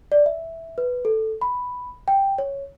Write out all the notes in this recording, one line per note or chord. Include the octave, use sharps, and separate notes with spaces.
D5
E5
B4
A4
B5
G5
C#5